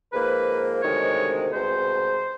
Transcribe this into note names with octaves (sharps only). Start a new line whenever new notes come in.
G#2 F3 A#3 B4
D2 C3 D#3 G#3 C#5
C2 B2 G#3 C5